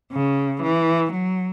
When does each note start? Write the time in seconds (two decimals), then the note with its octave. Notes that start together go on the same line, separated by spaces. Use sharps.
0.12 C#3
0.62 E3
1.13 F#3